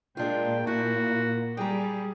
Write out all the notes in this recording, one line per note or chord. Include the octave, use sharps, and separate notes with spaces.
A#2 G#3 A#3 D4 F4 G5
A#2 E4 F#4
G3 G#4 G5 A#5